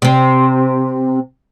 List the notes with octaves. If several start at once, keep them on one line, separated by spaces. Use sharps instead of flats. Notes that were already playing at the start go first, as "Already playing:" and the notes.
C3 C4